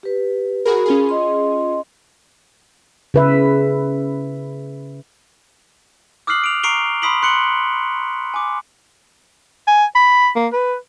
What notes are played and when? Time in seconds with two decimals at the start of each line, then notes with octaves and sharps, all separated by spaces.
0.03 G4 B4
0.66 F#4 G#4 A#4 B5
0.86 C#4 F4 G#4
1.09 D#5 C6
3.14 C#3 B4 E5
6.27 D6 D#6 F6 F#6 C7 F#7
6.44 D7 F7
6.63 A#5 C#6 C7 D7 F7 G7
7.02 B5 C6 D#6 B6 D7 F#7
7.22 C6 F#6 C#7 F#7 G7
8.34 G#5 D6
9.68 G#5
9.95 B5
10.36 A#3
10.53 B4